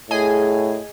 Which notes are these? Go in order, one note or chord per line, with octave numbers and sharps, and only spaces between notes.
A2 G#4 D#5 G#5